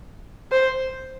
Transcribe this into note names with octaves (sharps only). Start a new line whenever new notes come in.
C5